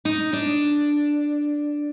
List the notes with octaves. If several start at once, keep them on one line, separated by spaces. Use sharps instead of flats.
D#4
D4